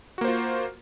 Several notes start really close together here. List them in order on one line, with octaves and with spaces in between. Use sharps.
F#4 A#3 C5 F4